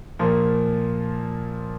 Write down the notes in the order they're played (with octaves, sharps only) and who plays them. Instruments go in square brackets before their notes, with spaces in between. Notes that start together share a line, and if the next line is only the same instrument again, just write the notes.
[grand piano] A#2 F3 A#3